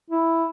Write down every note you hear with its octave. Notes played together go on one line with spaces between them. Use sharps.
E4